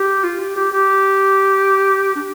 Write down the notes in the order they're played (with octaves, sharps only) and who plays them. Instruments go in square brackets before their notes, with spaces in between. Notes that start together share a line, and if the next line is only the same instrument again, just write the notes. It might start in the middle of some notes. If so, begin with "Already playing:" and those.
Already playing: [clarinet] G4
F4
G4
G4
G4
D4